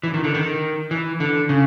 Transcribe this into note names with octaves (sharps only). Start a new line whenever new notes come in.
E3
D#3
D3
D#3
E3
D3
C#3